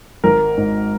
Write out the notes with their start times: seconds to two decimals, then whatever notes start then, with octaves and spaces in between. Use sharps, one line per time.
0.24 G#1 A#4
0.57 G#2